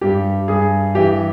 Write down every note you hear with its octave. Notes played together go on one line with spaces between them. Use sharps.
G2 G4
G2 G#4
E3 G4